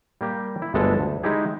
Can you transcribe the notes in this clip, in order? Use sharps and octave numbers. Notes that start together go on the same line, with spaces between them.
G3 A#3 G4
E4
G1 D2 G#3 D4 A4 B4
D2
G#3 D#4 E4 G4 G#4